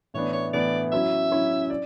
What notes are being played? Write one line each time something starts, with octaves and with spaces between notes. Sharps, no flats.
A2 E3 B3 D4 C#5
C#5
A2 E3 B3 D4 D5
F#3 C#4 E4 E5
F#3 C#4 E4
D5